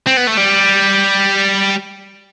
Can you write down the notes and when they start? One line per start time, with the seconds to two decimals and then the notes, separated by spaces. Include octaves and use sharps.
0.07 C4
0.17 B3
0.27 A3
0.37 G3